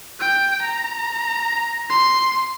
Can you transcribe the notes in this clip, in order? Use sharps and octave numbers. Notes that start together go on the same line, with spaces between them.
G5
A#5
C6